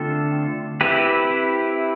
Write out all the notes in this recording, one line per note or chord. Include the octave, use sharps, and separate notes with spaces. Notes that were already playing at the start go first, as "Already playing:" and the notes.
Already playing: D3 A3 C4 F4 A4
C4 E4 G4 B4